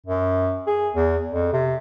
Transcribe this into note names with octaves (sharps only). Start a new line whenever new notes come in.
F#2
G#4
E2
F2
C3